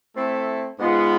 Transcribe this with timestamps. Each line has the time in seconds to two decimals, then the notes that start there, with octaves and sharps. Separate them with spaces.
0.14 A3 C4 E4 A4
0.78 G#2 G#3 B3 F4